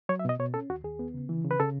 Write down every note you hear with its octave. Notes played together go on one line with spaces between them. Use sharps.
F#3 C#5
E5
B2 D#5
B2 C#5
C#4 A4
D#2 F#4
D#2 G#4
B3
C#3
E3
C#3
B4
C#3 A4